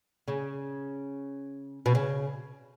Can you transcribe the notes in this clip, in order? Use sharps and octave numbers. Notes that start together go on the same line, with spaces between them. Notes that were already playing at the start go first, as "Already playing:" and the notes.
C#3
B2
C#3